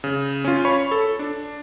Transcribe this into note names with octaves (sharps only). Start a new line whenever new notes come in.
C#3
C#4 F4
C#5 B5 C#6
A4
D4